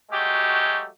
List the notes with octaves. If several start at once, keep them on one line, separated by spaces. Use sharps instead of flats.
F#3 G#3 A3 F#4 G4